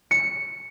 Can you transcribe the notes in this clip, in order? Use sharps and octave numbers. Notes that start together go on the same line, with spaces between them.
C#7